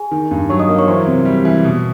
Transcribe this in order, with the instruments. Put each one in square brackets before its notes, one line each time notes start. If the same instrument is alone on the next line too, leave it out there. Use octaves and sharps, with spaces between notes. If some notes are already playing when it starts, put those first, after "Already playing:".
Already playing: [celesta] G#4 G#5
[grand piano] D#3
G2
[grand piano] F#3 [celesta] C#5 C#6
[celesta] D#5 D#6
[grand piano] A#3
[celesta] C#5 C#6
[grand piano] E3 [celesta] C5 C6
[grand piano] C3
G3
E3
B2